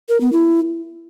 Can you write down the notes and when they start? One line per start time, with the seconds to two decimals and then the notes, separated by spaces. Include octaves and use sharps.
0.09 A#4
0.21 B3
0.33 E4